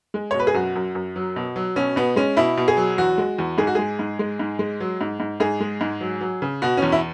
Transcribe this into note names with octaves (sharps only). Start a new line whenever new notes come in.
G#3
C#5
B2
B4
G#4
F#2 F#4
F#2
F#2
F#3
B2
F#3
B2 C#4
B2 B3
G#3 C#4
B2 E4
B2
G#4
F#3
E2 F#4
G#3
E2
G#2 G#4
F#4
G#3 G#4
G#2
G#3
G#2
G#3
F#3
G#2
G#2
G#2 G#4
G#3
G#2
F#3
F#3
C#3
B2 F#4
E2 C#4
E4